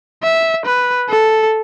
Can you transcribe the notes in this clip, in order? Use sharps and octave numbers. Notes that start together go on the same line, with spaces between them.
E5
B4
A4